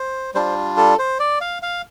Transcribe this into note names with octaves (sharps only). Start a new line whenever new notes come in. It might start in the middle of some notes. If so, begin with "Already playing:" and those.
Already playing: C5
G3 D4 F4 C5
A4
C5
D5
F5
F5